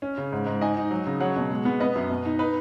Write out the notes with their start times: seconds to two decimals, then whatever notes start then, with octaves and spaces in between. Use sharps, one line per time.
0.02 C#4
0.18 C#3
0.32 G#2
0.47 G#2
0.61 D#4 D#5 G#5
0.77 D#4
0.91 F#3
1.06 C#3
1.20 F#3 C#5 F#5
1.36 B2
1.50 G#3
1.65 B3
1.80 B3 B4 D#5
1.95 F#2
2.10 B2
2.25 D#4
2.39 D#4 B4